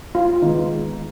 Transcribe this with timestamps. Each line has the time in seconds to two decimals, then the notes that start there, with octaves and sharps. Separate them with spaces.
0.15 F4
0.42 D#3 G#3 B3 D#4